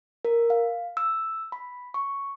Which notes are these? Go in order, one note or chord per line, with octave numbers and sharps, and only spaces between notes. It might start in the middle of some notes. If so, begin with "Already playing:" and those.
A#4
F5
E6
B5
C#6